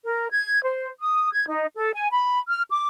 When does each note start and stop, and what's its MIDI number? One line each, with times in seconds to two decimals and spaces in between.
0.06 0.26 70
0.31 0.63 92
0.63 0.88 72
1.00 1.32 87
1.32 1.45 92
1.48 1.66 63
1.75 1.92 69
1.94 2.09 80
2.11 2.38 83
2.48 2.62 89
2.69 2.87 86